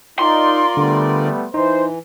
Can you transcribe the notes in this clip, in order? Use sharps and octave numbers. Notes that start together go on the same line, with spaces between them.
D#4 F4 A#4 D5 C6
D3 G3 A3 B3
E3 D#4 C5